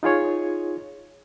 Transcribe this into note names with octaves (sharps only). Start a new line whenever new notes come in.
D#4 F4 G#4 C#5